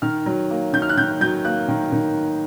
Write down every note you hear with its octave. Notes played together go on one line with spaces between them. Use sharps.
D#3 F6
F#3
A#3
D#3 G6
F6
F#6
D#3 G6
F#3 G6
A#3 F#6
D#3
D#3